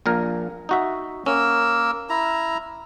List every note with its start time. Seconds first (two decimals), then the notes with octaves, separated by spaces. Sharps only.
0.06 A#1 A#2 A#4
0.69 D#4 F#4 E5
1.26 A#3 C#4 A#4 E6
2.10 E4 A#5